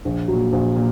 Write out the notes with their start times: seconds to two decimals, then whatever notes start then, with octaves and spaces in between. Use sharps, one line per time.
0.05 A#1
0.28 F#3
0.33 A#2
0.53 A#1
0.76 A#2